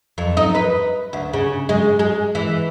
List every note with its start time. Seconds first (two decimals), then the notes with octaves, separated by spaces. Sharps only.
0.18 F2
0.37 D#4
0.55 B4
1.13 D2
1.33 C#3
1.69 G#3
1.99 G#3
2.35 E3